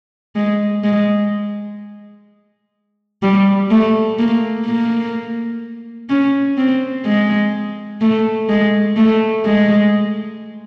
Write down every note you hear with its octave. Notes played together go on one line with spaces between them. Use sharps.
G#3
G#3
G3
A3
A#3
A#3
C#4
C4
G#3
A3
G#3
A3
G#3